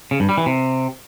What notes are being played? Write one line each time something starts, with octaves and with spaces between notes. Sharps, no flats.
C#3
G2
G3
E3
C3